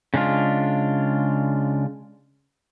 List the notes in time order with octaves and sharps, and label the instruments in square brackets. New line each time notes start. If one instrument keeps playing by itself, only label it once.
[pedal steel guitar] C#3 G#3 D4 F4